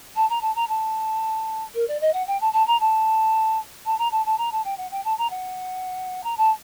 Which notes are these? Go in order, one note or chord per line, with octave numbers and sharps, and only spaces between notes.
A5
A#5
A5
A#5
A5
A#4
D5
D#5
F#5
G5
A5
A5
A#5
A5
A5
A#5
A5
A5
A#5
A5
G5
F#5
G5
A5
A#5
F#5
A#5
A5